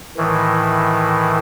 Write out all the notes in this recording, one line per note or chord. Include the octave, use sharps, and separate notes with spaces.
A2 D#3 E3